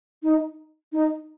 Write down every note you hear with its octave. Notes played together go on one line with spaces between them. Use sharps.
D#4
D#4